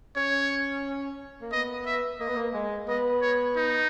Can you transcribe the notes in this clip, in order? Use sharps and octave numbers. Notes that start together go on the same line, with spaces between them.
C#4 C#5
A#3
B3 D#5
E5
A#3 D#5
B3
A#3
G#3
B3 D#5
C#5
D#4